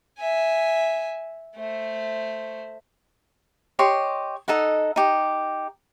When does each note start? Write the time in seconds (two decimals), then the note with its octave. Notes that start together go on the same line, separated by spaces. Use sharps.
0.19 E5 G#5
1.56 A3 C5
3.79 G4 C#5 D#5 C6
4.48 D#4 A4 D#5 F#5
4.96 D#4 G4